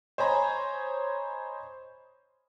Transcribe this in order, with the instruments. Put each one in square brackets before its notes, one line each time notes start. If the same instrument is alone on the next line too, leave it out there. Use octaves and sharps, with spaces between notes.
[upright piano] C5 C#5 D#5 G#5 A#5 B5